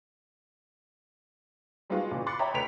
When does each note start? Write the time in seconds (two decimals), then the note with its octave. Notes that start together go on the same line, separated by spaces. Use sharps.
1.90 G3 G#3 B3 D#4 F4 F#4
2.11 A#2 C#3 E3
2.26 B5 C6 D6 F#6 A6 C#7
2.39 C#5 D#5 E5 G5 A#5 B5
2.54 D2 B4 B6 D7 F7